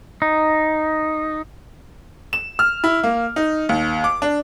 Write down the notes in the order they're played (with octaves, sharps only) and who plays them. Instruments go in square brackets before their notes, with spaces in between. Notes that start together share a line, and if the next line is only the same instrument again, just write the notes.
[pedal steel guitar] D#4
[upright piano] E7
F6
E4
A#3
D#4
D#2
D6
D4